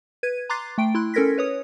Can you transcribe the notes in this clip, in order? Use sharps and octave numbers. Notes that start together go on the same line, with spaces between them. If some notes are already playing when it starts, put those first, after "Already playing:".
B4 G#6 D#7
A#5 C6 D6 F#6 A6 C7
A3 G5 D7
E4 C6 F#6
C#4 A4 A#4 G#6 A#6 B6
B4 C#5 D#6